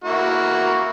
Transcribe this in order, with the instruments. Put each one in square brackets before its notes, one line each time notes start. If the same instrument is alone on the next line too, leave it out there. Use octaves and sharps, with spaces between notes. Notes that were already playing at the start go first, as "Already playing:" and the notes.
[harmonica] A#3 E4 F#4